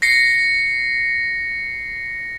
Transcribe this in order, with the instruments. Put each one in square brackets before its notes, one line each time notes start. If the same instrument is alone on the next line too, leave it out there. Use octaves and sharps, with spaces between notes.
[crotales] A#6 C7 C#7